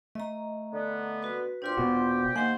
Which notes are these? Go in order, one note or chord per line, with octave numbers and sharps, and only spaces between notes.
A3 D#5 A#5
D3 B3
F#4 B4
A#2 C4 D4 F4 G4 C6
E1 B2 F#4
D#3 A#3 D#4 G4 C5 F#5 G#5